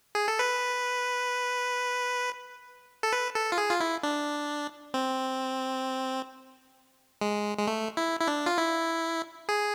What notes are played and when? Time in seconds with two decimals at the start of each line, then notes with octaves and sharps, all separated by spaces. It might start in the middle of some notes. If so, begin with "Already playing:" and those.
0.15 G#4
0.28 A4
0.39 B4
3.03 A4
3.13 B4
3.35 A4
3.52 F4
3.58 G#4
3.70 F4
3.80 E4
4.03 D4
4.94 C4
7.21 G#3
7.58 G#3
7.67 A3
7.97 E4
8.20 E4
8.28 D4
8.46 F4
8.58 E4
9.49 G#4